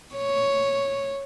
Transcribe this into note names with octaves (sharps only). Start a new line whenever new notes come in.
C#5